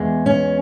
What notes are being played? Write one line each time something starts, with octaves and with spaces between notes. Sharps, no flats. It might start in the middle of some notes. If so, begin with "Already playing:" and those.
Already playing: E2 E3 G#3
C#4